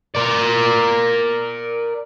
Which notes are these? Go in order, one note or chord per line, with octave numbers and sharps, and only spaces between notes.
A#4 D5